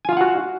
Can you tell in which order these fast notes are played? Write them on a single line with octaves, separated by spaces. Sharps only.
G#5 F4 F5 F#5 F#4